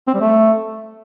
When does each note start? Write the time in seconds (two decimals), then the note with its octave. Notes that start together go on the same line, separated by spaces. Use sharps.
0.08 C4
0.14 G3
0.21 A3